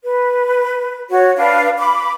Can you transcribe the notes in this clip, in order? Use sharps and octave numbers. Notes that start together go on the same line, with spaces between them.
B4
F#4 C#5
D4 B4 F5
B5 D6